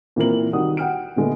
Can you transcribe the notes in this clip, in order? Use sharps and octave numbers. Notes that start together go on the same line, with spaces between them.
A#2 E3 C4 A#4 F#7
C2 D#3 F#4 F#5 D#6
F#5 G5 F6 D7
A#2 D3 G#3 A3 B3